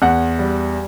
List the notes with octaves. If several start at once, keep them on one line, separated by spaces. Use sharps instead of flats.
E2 F#5
G3